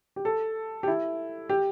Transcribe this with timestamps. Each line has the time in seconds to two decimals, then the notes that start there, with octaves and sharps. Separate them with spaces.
0.16 G4
0.25 A4
0.83 G4
0.88 E4
1.49 G4